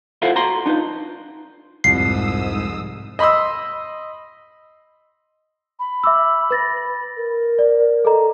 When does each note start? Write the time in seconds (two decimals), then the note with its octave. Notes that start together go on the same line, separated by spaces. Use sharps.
0.22 E4 F4 A4 C5 F5 F#5
0.36 F#4 A#5 C6
0.66 D4 D#4 F4 B4
1.84 C2 F2 G#2 D#6 E6 C7
3.19 D#5 B5 C6 D#6 E6
5.79 B5
6.04 E5 D6 E6
6.51 B4 A6 A#6
7.17 A#4
7.59 D5
8.05 A4 D#5 A#5